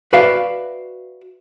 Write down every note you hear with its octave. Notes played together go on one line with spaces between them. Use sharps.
F#4 B4 D5 E5 F5